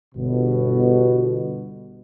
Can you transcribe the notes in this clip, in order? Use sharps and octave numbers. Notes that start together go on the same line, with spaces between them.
G1 B2